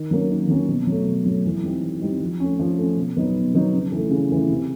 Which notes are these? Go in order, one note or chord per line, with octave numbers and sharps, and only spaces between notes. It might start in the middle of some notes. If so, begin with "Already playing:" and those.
Already playing: D#3
F#3 A#3 C#4
D#3
F#3 A#3 C#4
B2
F#3 A3
B2
F#3 A3
E3
G3 C4 D#4
E3
G3 C4 D#4
F3
A3 C#4
F3
A3 C#4
B2
F#3 B3 D#4
B2
F#3 B3 D#4
C#3
E3 A3
C#3
E3 A3
C3